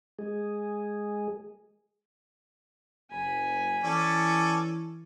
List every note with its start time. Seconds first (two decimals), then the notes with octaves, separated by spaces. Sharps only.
0.19 G#3 G#4
3.11 F#1 G#5 B5
3.84 E3 C#4 A4 D5